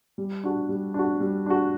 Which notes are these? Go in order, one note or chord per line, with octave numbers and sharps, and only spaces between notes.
G3
D4 F#4
G3
D4 F#4
G3
D4 F#4